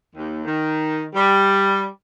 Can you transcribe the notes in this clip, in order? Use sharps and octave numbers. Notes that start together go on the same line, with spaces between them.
D#2
D#3
G3